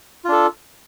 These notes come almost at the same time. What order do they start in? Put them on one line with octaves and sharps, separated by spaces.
F4 D4 A4